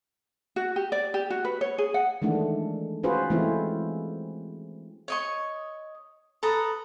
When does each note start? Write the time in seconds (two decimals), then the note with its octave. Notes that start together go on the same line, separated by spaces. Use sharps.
0.56 F#4
0.76 G4
0.92 D5
1.14 G4
1.30 F#4
1.45 B4
1.61 C#5
1.78 G#4
1.94 F#5
2.22 D#3 E3 G#3 A3 D4
3.03 C#4 F4 F#4 G#4 B4 C5
3.30 E3 G#3 A3 C4 E4 F4
5.08 C#5 D#5 C#6
6.43 A4 B4 A#5 D#6